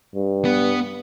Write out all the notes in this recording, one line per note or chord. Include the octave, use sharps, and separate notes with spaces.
G2
B3